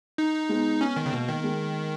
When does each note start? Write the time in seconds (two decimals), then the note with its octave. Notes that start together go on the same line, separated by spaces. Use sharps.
0.18 D#4
0.49 G#3 B3
0.81 G#3 B3 C#4
0.96 D#3
1.06 C#3
1.13 B2 A#3
1.28 D#3
1.44 G#3